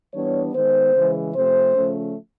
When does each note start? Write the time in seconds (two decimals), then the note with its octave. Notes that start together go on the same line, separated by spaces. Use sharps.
0.13 E3 G3 B3 D4 C#5
0.54 D#3 G#3 B3 C5
0.94 C#3 E3 G#3
1.34 C3 F3 A3 C4 C5
1.75 C#3 F3 A3 C#4